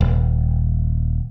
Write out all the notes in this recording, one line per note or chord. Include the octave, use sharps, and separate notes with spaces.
D#1